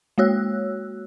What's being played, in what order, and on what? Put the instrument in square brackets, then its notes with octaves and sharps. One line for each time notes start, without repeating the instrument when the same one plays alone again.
[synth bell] G#3 A#3 F#4 C#5 E6 F#6